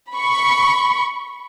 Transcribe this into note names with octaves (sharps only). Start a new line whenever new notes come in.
B5 C#6